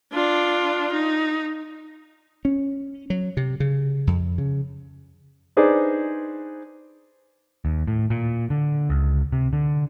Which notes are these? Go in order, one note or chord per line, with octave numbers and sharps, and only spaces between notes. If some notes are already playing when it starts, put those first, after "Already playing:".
D4 F4
D#4
C#4
F#3
C3
C#3
F2
C#3
D4 D#4 G#4 B4 C5 D5
D#2
A2
A#2
D3
C#2
C3
D3